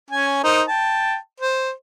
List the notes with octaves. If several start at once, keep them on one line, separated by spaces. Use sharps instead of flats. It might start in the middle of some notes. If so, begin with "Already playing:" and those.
C#4 G#5
D#4 A#4 C5
G5 A5
C5